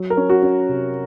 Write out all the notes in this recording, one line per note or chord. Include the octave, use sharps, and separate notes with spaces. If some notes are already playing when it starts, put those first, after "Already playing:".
Already playing: F#3
A#4
C#4
F#4
C#4
C3